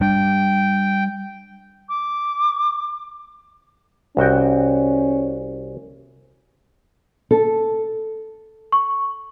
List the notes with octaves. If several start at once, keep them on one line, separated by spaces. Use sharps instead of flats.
G3 D4 G5
D6
C2 C#4 F#4 G5
A4
C#6